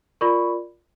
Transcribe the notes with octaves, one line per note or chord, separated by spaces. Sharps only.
F4 A#4 D5 B5 C#6